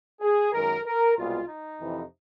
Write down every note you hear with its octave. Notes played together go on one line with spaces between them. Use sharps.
G#4
F#2 D#3 G#3 A#4
A#4
C2 B2 G#3 F4
D#4
F2 C3 E3